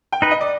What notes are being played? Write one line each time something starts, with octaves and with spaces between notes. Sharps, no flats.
G5
D#4 B4
D#5
D5